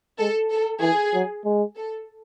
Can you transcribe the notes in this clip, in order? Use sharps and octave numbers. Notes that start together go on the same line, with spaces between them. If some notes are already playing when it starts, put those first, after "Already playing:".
G#3 A4
A4
E3 G#4
F#3
G#3
A4